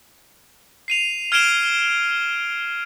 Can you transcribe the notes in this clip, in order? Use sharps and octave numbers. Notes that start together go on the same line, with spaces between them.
C7 D#7 F7
F6 G#6 C7 D7 E7 G7